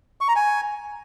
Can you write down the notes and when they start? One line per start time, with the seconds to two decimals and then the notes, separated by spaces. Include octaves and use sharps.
0.21 C#6
0.28 A#5
0.36 G#5